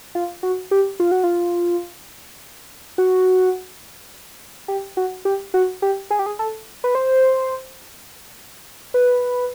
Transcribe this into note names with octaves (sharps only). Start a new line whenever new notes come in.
F4
F#4
G4
F4
F#4
F4
F#4
G4
F#4
G4
F#4
G4
G#4
G4
G#4
A4
B4
C5
B4